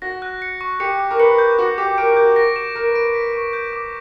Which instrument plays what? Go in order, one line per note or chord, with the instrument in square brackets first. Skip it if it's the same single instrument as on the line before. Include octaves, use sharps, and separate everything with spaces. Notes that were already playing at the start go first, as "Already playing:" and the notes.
[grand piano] F#4 [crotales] A#6
[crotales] F#6
C#7
C#6
[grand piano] G4 [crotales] C#7
[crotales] D6
[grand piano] A#4
[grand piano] B4 [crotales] C#7
[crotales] G6
[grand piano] F#4 [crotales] D6
[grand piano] G4 [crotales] D6
[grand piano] A#4 [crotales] D7
[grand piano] A#4
[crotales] G6
[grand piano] F#4
[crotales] A#6
E7
[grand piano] A#4 [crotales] D7
[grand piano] B4
[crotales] D7
B6
C#6
G6
D6